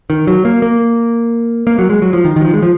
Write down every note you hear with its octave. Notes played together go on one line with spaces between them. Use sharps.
D#3
F#3
A#3
A#3
A#3
F#3
G#3
F#3
F3
D#3
D#3
F#3
F3
G#3
F3